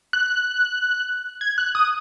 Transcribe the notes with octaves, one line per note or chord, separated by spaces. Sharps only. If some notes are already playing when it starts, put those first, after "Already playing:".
F#6
G#6
F#6
D#6